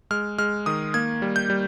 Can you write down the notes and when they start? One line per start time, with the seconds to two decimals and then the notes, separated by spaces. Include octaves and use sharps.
0.11 G#3 F6
0.38 G#3 F6
0.66 D#3 D#6
0.94 A#3 G#6
1.22 G3
1.36 G6
1.50 G3